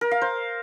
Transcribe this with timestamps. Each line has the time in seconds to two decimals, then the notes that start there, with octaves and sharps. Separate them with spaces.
0.01 A#4
0.11 F5
0.21 C5